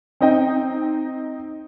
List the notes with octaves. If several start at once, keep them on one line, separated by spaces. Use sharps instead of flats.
C4 D#4 D#5 G5